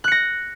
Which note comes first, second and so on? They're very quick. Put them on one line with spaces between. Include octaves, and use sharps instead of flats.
F#6 C#7 A#6